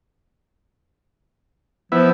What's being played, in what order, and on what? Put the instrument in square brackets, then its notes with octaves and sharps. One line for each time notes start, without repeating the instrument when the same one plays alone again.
[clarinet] F3 [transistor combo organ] B3 E4